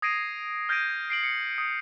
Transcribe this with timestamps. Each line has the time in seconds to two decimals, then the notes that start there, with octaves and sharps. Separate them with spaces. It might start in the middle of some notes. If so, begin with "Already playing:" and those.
0.02 D#6 G#6 A#6 C7 D7 D#7
0.69 F6 G6 G#6 A#6 D7 D#7
1.10 C7 D7 F#7
1.23 C#7
1.58 D#6